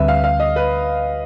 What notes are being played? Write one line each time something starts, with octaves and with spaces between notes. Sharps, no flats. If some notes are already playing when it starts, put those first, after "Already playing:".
Already playing: D2 D3 G3 C4 B4 E5
F5
F5
D#5
B4